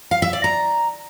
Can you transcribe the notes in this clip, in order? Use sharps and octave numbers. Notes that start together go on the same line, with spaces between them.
F5
E5
D5
A#5